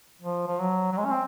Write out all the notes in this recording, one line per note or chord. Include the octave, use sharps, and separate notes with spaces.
F3
F3
F#3
F#3
G#3
C#4
C4